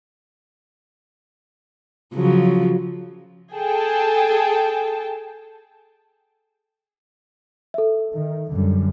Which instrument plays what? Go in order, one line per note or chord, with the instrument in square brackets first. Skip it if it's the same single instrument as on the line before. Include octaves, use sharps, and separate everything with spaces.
[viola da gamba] C#3 F3 F#3
[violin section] G#4 A4 G5 A5
[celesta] A4 E5
[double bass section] D#3
F#2 D3 G3